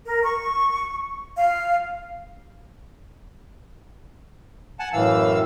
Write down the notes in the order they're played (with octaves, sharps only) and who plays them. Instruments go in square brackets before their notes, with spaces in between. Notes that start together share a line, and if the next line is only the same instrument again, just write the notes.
[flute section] A#4
C#6
F5
[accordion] F#5 G#5 A5
F#2 A2 E3 F5 E6